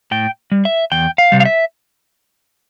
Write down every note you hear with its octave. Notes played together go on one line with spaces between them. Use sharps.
A2 G5
G3
E5
E2 G5
F5
C3 G3
F5
E5